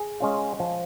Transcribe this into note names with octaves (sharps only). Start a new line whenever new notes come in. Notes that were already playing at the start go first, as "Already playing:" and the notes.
Already playing: G#4
G#3 C#4 F4
F3